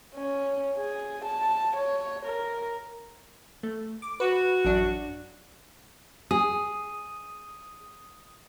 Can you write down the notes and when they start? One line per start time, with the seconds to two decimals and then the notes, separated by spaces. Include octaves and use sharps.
0.15 C#4
0.76 G#4
1.24 A5
1.76 C#5
2.25 A#4
3.63 A3
4.02 D6
4.20 F#4 B4
4.65 A1 F#2 D4
6.31 G#4 D#6